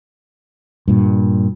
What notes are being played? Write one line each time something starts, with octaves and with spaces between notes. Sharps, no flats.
G2 A#2